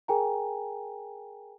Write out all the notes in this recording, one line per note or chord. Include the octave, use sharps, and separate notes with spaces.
G#4 A#4 G5 G#5 A#5